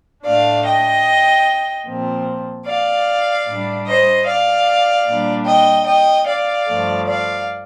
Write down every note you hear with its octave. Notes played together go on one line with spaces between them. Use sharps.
A2 A3 D4 D5 F5
D#5 G5
A#2 F3 C4
D5 F5
A2 G3 D4
C5 D#5
D5 F5
A#2 G3 D4
D#5 G5
D#5 G5
D5 F5
G2 F3 A3
D5 F5